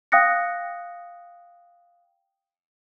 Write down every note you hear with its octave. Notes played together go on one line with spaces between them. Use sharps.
F5 G5 D#6 F#6 A#6 C#7